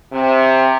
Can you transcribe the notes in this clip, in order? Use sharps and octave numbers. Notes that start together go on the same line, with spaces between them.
C3